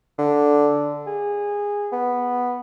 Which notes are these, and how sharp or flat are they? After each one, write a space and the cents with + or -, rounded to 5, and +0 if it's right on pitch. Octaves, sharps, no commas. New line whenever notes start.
D3 -5
G#4 -20
B3 -5